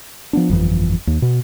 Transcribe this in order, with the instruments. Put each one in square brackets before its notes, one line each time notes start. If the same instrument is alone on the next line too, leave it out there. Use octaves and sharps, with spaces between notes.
[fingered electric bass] F3 B3 D4
G1 F2 E3
D#2
B2